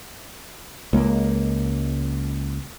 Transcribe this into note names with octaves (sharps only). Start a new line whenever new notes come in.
C#2 G#3 A#3